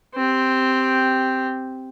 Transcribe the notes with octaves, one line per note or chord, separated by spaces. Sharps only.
C4 G4